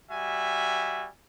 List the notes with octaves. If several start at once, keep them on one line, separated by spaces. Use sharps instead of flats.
G3 F#4 E5 G#5